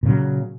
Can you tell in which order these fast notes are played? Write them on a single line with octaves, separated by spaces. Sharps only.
A#2 C#3 F#3